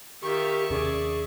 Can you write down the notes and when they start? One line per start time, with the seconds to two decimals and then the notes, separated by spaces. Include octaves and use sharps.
0.22 D#3 F4 G4 E5 C#6
0.70 D#2 C3 C#4 G#4 D5